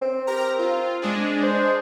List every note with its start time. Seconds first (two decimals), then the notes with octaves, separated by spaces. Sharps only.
0.02 C4
0.27 G4 A#4 A#5
0.59 F4
1.02 G#3 D4 G#4
1.43 C5